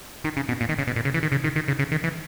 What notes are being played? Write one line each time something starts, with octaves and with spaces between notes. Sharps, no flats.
D#3
C#3
B2
A#2
D#3
C#3
B2
A#2
C#3
E3
D#3
C#3
D#3
D#3
C#3
C#3
D#3
E3